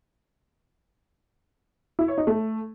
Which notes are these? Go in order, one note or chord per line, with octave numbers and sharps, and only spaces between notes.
E4
C#5
D#4
A3